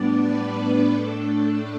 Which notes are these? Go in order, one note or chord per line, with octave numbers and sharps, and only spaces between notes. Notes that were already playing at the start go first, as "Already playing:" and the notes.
Already playing: A2 G3 B3 D4 D5
B4
A2 A3 D4 A4